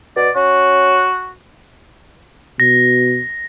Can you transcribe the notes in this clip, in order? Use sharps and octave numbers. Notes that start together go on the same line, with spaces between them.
B2 D5
C#4 F#4
B2 A#6